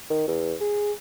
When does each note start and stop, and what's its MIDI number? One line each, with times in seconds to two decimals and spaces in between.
0.10 0.25 51
0.28 0.54 40
0.61 0.92 68